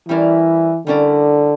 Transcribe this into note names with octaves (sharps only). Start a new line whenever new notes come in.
E3 G3 C#4 E4 A#4 D5
D3 G3 C#4 E4 A#4 D5